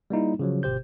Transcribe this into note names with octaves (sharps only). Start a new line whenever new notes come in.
G3 A#3 D#4 E4
C#3 F3 F#3
G1 B2 G4 C5 G6